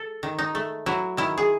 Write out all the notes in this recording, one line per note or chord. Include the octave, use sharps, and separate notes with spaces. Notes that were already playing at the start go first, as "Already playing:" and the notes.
Already playing: A4
D#3
D#4
A3
F#3 E4
D#3 E4
G#4